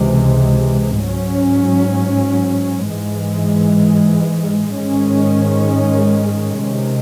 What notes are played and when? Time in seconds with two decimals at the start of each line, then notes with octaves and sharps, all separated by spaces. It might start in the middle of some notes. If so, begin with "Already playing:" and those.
Already playing: C#2 C3 E3 G#3
1.03 G#2 F#3 C#4
2.89 G#2 E3 G#3
4.76 G#2 D#3 G#3 C#4
6.63 C3 D#3 G#3